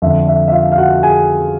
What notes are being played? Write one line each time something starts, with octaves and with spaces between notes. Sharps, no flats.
F2 D3 E5
E5
E5
F4 F5
F5
F#4 F#5
G#4 G#5